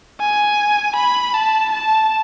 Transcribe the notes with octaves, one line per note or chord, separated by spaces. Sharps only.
G#5
B5
A5
A5